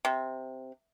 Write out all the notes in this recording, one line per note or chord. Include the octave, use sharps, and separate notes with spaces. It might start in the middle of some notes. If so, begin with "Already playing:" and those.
C3